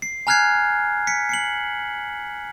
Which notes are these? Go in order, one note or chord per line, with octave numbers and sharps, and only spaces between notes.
C7
G#5 A#5 F6 F#6 G#6 C7
B6 C#7
C7 C#7 F#7